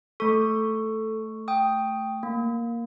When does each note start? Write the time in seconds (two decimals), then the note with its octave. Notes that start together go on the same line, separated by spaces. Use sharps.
0.20 A3 A4 C#6
1.48 G5 D#6
2.23 A#3